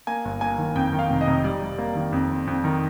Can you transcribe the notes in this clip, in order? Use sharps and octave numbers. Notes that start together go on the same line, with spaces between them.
A#3 G#5
G1
A#3 G#5
D#3
F2 G5
D#3
F5
F1
D#5
F1
G3 D5
G3
A#3
D#3
F2
C4
F2
D#3